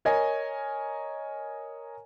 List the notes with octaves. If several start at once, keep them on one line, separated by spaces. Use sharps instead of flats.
A#4 C#5 D#5 G#5